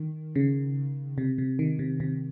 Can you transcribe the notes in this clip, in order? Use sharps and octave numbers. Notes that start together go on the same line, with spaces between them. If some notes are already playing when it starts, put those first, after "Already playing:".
Already playing: D#3
C#3
C3
C3
D#3
C3
C3